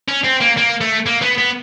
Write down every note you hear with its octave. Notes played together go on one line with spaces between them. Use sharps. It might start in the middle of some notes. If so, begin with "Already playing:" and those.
C#4
C4
A#3
A#3
A3
A#3
B3
B3